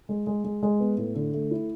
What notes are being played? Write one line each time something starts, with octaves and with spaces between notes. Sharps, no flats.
G#3
G#3
G#3
G#3
B3
A2
D3
A3
E4